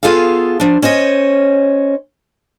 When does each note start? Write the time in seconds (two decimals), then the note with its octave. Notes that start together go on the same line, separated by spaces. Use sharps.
0.03 B3 F4 G#4 A4 F5
0.60 F3 D4
0.82 C#4 C5 C#5 D#5